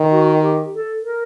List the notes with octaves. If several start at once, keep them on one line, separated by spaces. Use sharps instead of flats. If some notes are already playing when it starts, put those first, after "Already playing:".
Already playing: D#3
F#4
G4
A4
A#4